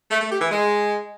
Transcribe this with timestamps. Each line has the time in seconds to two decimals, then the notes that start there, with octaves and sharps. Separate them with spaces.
0.11 A3
0.21 A3
0.31 G4
0.41 E3
0.51 G#3